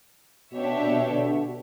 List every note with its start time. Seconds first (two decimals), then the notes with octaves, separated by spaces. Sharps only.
0.53 B2 D4 G4 C#5 E5
0.81 B2
1.09 B2 D3